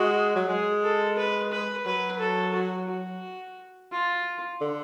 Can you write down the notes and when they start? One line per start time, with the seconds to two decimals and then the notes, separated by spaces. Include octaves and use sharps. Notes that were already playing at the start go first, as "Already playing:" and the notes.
Already playing: G#3 F#4
0.35 F#3
0.48 G#3 G#4
0.83 A4
1.17 B4
1.52 B4
1.86 F#3 B4
2.19 A4
2.54 F#4
2.89 F#4
3.92 F4
4.61 D3